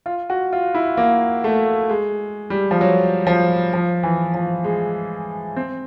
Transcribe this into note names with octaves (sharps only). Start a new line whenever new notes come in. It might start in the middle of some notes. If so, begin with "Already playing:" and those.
F4
F#4
F4
E4
A#3
A3
G#3
G3
F3
F#3
F3
F3
E3
F3
G#3
C4